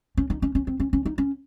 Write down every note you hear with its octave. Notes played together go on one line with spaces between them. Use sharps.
C#4
D#4
C#4
C#4
C4
C#4
C#4
D#4
C#4